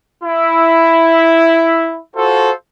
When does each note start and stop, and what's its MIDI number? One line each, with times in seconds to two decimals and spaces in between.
0.24 2.01 64
2.15 2.51 65
2.15 2.51 66
2.15 2.51 69
2.15 2.51 72